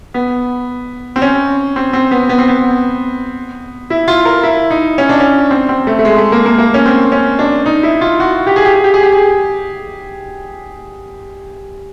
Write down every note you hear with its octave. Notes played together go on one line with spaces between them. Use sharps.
B3
C4
C#4
C4
C4
B3
B3
C4
B3
E4
F4
A#4
E4
D#4
C#4
D4
C#4
C4
C4
A3
A3
G#3
A3
A#3
A#3
A#3
C#4
C4
C#4
D4
D#4
E4
F4
F#4
G4
G#4
G4
G#4
G4
G#4
G4
G#4